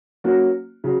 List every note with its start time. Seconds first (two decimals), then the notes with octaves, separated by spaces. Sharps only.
0.24 F#3 A#3 C#4 F#4
0.84 C#3 F#3